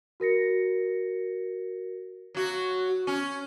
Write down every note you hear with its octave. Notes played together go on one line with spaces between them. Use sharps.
F#4 A#4 A#6 C#7
F#3 F#4
C#4